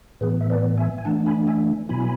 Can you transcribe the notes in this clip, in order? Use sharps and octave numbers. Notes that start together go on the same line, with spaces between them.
A2 E3 B3 G#4 B4
E5
B4 D5
E5 G#5
G#5
E3 A3 D4 F#5 A5
G#5 B5
E5 G#5
B2 F#3 B3 E4 G#5 B5